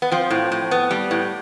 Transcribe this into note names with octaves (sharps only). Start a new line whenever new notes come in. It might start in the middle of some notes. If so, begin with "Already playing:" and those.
B3
F3 C4
A2
A2
B3
G3
A2